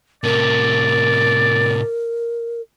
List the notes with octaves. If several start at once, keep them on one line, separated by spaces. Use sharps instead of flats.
A2 C3 A#4 D5